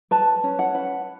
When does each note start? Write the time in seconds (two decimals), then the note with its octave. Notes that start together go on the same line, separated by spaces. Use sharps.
0.11 B4 A5
0.44 C#4
0.59 F#5
0.75 B4